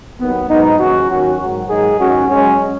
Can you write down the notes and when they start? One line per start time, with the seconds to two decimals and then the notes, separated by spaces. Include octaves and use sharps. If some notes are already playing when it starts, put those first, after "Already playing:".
0.20 D#2 D#3 F#3 B3
0.50 G#2 F#3 B3 D#4
0.79 D#2 C#3 F#3 C#4 F#4
1.09 D#2 D#3 F#3 C#4 F#4
1.39 G#2 D#3 F#3
1.69 G#2 D#3 F#3 D#4 G#4
1.98 G#2 D#3 F#3 C#4 F#4
2.29 F#2 F#3 G#3 C#4